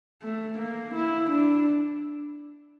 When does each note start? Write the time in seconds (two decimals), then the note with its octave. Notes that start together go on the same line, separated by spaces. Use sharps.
0.23 A3
0.59 A#3
0.95 E4
1.30 D4